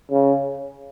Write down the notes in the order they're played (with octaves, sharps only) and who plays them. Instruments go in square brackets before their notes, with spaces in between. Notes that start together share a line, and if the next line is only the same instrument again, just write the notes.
[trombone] C#3